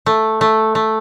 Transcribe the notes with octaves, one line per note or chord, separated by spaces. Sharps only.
A3
A3
A3